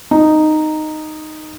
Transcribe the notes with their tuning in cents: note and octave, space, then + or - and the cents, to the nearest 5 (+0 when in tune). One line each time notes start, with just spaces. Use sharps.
D#4 -10